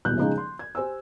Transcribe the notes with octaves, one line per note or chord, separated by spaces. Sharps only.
D#1 B1 E2 F#6 G6
C#3 F3 G#3 D#4
C6
G#6
G4 C5 G#5 E6